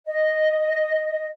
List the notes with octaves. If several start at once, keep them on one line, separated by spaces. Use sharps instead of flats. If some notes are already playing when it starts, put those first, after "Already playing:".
D#5